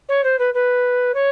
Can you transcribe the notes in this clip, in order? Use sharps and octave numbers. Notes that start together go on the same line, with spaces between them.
C#5
C5
B4
B4
C#5